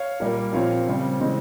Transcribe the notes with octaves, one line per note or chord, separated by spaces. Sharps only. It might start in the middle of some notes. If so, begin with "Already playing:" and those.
Already playing: C#5 F5
A#2 G3 A#3
A#2 F3 C4 C#5 F5
C#3 G3 C4
C#3 E3 G#3 C4